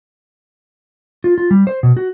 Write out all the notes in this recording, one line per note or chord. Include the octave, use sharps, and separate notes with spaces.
F4
F4
G3
C5
B2
F#4